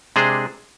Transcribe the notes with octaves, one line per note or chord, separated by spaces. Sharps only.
C3 G#3 D4 G#4 C5